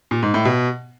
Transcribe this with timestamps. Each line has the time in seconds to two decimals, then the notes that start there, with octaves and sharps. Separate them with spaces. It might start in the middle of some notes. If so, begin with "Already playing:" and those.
0.11 A#2
0.22 G#2
0.34 A2
0.45 B2